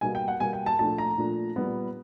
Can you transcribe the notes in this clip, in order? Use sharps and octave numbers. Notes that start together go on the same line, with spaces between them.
B2 G3 A#3 G#5
G5
F#5
B2 G3 A#3 G#5
G5
A5
A#2 F3 A3 D4 A5
A#5
A#2 F3 A3 D4
A#2 G3 B3